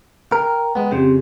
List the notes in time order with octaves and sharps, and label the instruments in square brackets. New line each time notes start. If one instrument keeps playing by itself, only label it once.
[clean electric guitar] A#4 [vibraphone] G5
[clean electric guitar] G#3 B3
[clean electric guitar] F2 C#3 [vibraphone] C4 G4